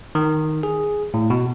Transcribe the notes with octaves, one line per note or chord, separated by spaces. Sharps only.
D#3
G#4
A2
B2